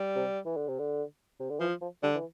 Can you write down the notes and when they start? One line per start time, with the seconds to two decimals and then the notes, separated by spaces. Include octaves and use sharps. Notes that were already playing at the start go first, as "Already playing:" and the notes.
Already playing: G3
0.16 C3
0.45 E3
0.57 D3
0.68 C3
0.79 D3
1.40 C3
1.50 D3
1.60 E3 F3
1.81 F3
2.03 D3 G3
2.15 E3